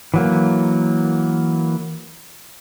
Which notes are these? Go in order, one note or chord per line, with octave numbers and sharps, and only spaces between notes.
E3 F#3 A#3